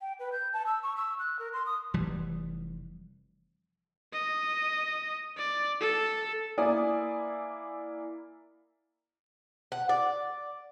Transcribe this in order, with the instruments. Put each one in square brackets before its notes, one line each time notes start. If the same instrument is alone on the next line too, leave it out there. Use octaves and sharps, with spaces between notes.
[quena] G5
B4
G6
A5
E6
C#6
E6
F#6
A#4
C6
D#6
[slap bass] F1 E3 G3
[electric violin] D#5
D5
A4
[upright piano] A#3 E4 D5 G#5 D#6
[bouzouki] F#5
D5